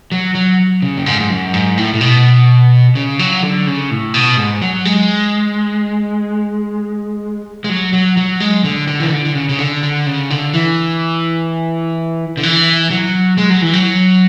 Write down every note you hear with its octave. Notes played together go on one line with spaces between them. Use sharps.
F#3
F#3
C#3
F#2
G#2
G#2
F#2
G#2
A2
A2
B2
C#3
F#3
D3
C#3
A2
B2
G#2
F#3
G#3
G#3
F#3
F#3
F#3
G#3
D3
D3
E3
D3
D3
C#3
C#3
D3
D3
C#3
D3
E3
D3
E3
F#3
G#3
F#3
E3
F#3